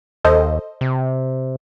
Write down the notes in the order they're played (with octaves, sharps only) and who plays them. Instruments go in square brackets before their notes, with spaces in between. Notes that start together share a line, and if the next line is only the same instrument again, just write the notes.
[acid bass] D#2 [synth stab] A4 C5 D#5
[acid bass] C3